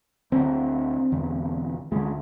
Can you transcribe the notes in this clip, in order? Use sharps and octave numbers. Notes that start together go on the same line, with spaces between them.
D2 D3 C4
E1 E2 D3
D2 D3 G#3